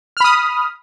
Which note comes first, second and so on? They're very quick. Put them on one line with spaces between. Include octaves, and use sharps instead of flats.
F6 B5 D#6